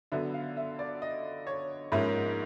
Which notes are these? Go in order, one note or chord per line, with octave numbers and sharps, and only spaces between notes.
D3 F#3 B3 E5
F5
E5
D5
D#5
C#5
G#2 F3 A#3 C#4 E5